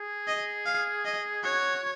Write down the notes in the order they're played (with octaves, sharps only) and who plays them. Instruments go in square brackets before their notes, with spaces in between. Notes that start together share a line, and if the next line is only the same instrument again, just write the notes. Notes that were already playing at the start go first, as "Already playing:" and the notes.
Already playing: [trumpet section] G#4
[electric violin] D#5
F5
D#5
[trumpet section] F#4 [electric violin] C#5